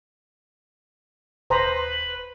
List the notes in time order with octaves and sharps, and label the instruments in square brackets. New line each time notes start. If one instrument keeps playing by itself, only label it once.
[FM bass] D#1 [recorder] B4 [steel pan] C5 A#5